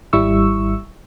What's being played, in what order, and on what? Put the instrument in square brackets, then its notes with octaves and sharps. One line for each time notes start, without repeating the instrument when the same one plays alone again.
[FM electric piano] G#1 G3 E4 C#6 E6